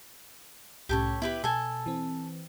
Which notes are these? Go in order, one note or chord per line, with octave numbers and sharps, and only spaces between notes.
C2 A2 C#4 G4 A4 C#5
B3 E4 G4 B4
B2 A4 G#5
E3 C4